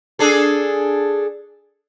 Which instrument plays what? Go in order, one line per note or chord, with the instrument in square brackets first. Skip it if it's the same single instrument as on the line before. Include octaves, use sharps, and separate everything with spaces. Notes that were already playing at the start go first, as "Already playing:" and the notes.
[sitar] D4 G#4 A4